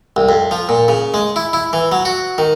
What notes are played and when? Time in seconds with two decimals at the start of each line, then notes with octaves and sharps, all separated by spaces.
0.16 C2
0.29 F2
0.51 F3
0.69 A#2
0.88 C#3
1.14 G#3
1.36 E4
1.53 E4
1.73 E3
1.92 F#3
2.05 F#4
2.38 D#3